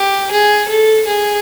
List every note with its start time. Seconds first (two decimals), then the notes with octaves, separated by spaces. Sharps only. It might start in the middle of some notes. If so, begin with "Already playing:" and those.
Already playing: G4
0.31 G#4
0.69 A4
1.06 G#4